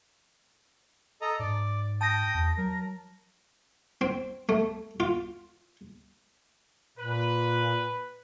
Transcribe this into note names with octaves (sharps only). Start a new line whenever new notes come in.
A4 D#5 A#5
G#2 D5
G5 A5 D#6 A#6
E2
F#3 A#4
C4
A3
F4
A#2 B4